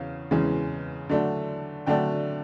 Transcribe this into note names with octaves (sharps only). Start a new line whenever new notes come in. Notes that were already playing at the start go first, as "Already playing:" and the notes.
Already playing: E2 C#3 C#4 F5
E2 C#3 E3 G#3 C#4
D3 F#3 A3 D4
D3 F#3 A3 D4 G5